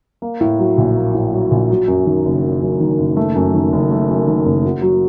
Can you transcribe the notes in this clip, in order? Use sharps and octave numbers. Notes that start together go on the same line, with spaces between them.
A#3
A2
F#3
A#1
A#3
A2
F#3
A#1
F#3
F#2
D#3
F#1
F#3
F#2
D#3
F#1
A3
F#2
D#3
F#1
A3
F#2
D#3
F#1
F#4
F#3